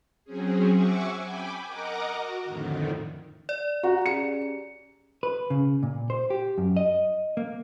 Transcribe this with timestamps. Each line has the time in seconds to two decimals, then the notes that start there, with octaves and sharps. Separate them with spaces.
0.25 F#3 C4 C#4 G#4
0.73 E5 F#5 G#5 C#6 D6 E6
1.21 G5 G#5 B5 D6
1.67 A#4 D#5 F#5 A#5 D6
2.12 F#4
2.44 F2 A2 D3 D#3
3.49 D5
3.83 F#4 A#5
4.06 C#4 G4 G#4 C#7
5.23 B4
5.50 C#3
5.83 A#2
6.10 C5
6.30 G4
6.58 F#2
6.77 D#5
7.37 A#3